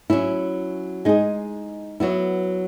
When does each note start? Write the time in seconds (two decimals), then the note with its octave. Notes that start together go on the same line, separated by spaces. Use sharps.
0.10 F#3 C#4 E4
1.05 G#3 D#4 G#4
2.00 F#3 B3 E4